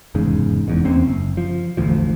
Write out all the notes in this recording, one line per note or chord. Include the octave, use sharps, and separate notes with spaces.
F1 E2 G#2 C#3
F1 E2 G#2
E2 A#3 C4 C#4
F#1
F3
E1 A1 D2 F3